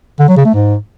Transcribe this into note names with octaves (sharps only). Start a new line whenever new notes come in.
D3
F#3
C#3
A3
G#2